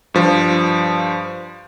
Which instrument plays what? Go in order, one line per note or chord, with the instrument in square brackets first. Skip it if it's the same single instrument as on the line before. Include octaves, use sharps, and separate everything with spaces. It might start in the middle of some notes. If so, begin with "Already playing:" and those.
[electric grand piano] G2 F3